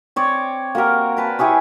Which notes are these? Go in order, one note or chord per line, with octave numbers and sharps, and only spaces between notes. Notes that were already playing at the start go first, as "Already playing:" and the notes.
C4 C#5 D5
A#3 F#4 G4 A#4
A#4 B4 A5
E4 G4 G#4 C#5